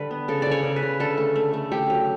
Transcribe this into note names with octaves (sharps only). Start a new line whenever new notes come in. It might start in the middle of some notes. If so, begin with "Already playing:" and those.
Already playing: D3 G3 B4
B3
C#3 A4
C#3 D5
C#5
C#3
B4
C#3
D3 A4
A3
A3
A3
A3 G4
F#3